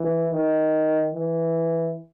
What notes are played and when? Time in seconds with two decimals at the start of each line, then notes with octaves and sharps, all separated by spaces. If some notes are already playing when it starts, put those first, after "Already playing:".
Already playing: E3
0.32 D#3
1.14 E3